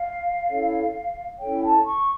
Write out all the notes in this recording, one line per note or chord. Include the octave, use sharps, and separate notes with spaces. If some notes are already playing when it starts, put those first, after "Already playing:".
Already playing: F5
C#4 E4 A4 C#5
C#4 E4 A4 C#5 G5
A5
C#6